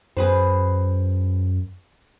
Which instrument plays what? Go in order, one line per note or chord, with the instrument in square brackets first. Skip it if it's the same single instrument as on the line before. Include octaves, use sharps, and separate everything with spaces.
[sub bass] F#2 [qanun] G#4 B4 C5